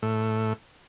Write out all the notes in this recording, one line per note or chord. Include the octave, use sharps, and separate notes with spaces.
A2